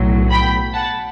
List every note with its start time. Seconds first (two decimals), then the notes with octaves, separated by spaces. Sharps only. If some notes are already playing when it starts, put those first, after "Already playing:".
Already playing: B1 A2 F#3
0.31 G5 B5
0.74 F#5 A5